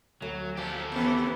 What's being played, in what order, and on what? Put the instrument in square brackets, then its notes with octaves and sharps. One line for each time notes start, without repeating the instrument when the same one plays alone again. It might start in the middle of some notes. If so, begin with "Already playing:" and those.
[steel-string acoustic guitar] D2 [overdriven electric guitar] F#3
[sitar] A#2 F3 [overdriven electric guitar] G4 A4
[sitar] C3 D#3 E3 [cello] B3